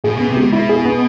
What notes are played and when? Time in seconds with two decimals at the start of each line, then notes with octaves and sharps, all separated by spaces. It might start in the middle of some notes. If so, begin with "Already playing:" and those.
0.04 A2 G#4
0.16 B2 B3
0.29 C3
0.37 B2 G#3
0.52 B2 E4
0.69 G#4
0.85 B3